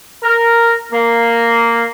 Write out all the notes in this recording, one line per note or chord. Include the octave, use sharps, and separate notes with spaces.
A#4
A#3